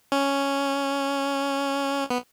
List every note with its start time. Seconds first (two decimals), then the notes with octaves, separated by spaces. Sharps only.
0.12 C#4
2.10 B3